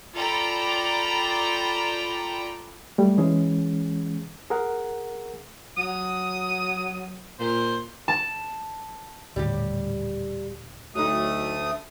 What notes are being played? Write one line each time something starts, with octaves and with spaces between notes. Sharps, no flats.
F4 A4 D5 G5 A#5 B5
G3 A3
E3 G#3 C#4 G#4
G#4 A#4 F#5
F#3 D#6
A#2 C5
A5
D#1 A2 D3 G3 G4
D2 F#3 A3 D#4 D#6